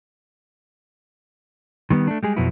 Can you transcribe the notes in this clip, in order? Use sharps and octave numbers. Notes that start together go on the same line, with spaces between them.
D#3 G3 B3
A3 D4
G3 G#3 G#4
F2 B2 F#3 B3 E4